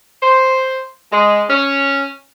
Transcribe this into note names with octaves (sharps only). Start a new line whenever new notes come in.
C5
G#3
C#4